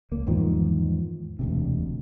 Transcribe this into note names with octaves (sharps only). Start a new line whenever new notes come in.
C#2 A#3
E2 G#2 D#3 F3
E1 D2 C3